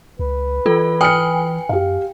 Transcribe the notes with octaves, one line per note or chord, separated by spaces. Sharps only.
C#2 B4
E3 F4 A4
G5 G#5 D#6 F6 C#7
F#2 G4 F5